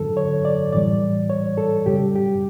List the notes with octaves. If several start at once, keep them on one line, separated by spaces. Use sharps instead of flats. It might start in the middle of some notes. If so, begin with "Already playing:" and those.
Already playing: F#2 D3 F#3 A4
C#5
D5
A2 E3 G3 D5
C#5
A4
F#2 C#3 G3 G4
G4